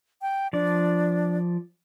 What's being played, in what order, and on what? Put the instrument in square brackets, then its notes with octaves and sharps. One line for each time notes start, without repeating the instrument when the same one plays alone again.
[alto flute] G5
[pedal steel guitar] F3 D5 [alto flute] D4